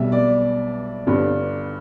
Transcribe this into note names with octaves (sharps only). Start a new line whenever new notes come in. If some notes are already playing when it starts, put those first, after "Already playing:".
Already playing: B1 B2 G3 E5
D5
G1 G2 D3